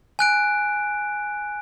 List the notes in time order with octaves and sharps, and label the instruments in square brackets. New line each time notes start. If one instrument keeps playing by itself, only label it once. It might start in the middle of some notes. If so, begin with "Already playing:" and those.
[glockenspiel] G#5 F#6 D7